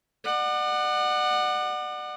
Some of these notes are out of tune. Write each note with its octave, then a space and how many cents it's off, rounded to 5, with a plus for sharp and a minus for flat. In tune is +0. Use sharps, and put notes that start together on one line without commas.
D5 +40 F#5 +0